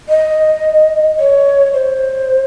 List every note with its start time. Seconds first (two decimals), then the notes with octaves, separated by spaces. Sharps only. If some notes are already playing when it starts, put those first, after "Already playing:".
0.09 D#5
1.19 C#5
1.74 C5